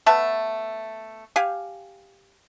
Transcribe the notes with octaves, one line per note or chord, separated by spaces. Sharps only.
A3 B3 E5 A5
G4 F5 G#5